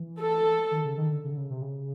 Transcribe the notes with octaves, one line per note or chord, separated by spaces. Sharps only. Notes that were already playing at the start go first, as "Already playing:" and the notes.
Already playing: E3
A4
D#3
C#3
D#3
D3
C#3
D3
C#3
C3
C#3